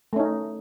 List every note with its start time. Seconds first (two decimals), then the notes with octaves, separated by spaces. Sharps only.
0.13 A3
0.16 C#4
0.20 D#4